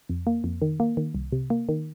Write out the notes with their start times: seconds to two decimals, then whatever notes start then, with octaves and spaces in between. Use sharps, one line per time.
0.09 F2
0.27 A#3
0.44 F2
0.62 D#3
0.80 A#3
0.97 D#3
1.15 C2
1.32 C3
1.50 A#3
1.69 D#3